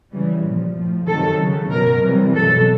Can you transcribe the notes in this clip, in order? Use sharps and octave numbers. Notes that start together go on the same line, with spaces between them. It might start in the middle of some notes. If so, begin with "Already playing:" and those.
C#3 E3 G3
A#2 F3
A2 F3
C3 D#3 F#3 A4
C#3 F#3
B2 F#3 A#4
C3 E3 G3
B2 F#3 A4